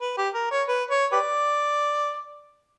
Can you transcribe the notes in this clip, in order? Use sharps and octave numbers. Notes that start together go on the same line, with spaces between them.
B4
G4
A#4
C#5
B4
C#5
G4 B4 D5